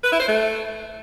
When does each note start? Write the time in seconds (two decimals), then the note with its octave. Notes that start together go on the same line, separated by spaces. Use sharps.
0.04 B4
0.12 E4
0.20 C5
0.28 A3